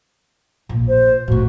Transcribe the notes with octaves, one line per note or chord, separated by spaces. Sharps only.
A#1
C5
A2 C3 F#4